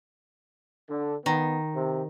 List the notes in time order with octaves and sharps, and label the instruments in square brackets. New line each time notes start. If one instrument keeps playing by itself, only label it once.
[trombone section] D3
[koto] D#3 [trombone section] B3
[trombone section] C3